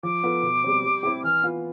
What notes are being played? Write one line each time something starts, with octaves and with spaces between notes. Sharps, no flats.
F3 D6
B3 F4 A4
B2
G3 C4
G3
C4 E4 G4
E3 F6
B3 F4